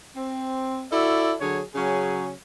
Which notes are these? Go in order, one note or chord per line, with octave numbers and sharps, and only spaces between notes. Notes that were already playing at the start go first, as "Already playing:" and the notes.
C4
E4 F#4 A4 D5
D3 F#3 G#4 C#5
C#3 F#3 C#4 G#4